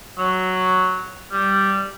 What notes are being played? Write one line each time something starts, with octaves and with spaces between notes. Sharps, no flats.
F#3
G3